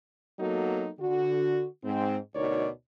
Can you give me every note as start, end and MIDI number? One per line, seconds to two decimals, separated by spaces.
0.39 0.89 54
0.39 0.89 58
0.39 0.89 59
0.39 0.89 63
0.39 0.89 66
0.39 0.89 69
0.99 1.64 50
0.99 1.64 66
1.84 2.17 44
1.84 2.17 60
2.35 2.68 38
2.35 2.68 47
2.35 2.68 63
2.35 2.68 70
2.35 2.68 73
2.35 2.68 74